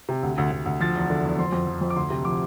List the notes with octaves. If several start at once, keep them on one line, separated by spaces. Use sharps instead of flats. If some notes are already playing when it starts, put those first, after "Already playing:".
C3
D2
D2
D2
D2
F3 A6
E2
D3
E2
F2 C6
F2
F3
F2
D6
D2 C6
C3
F3 D6